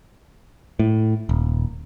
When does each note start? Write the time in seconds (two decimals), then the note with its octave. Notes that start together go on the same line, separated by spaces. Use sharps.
0.79 A2
1.29 D#1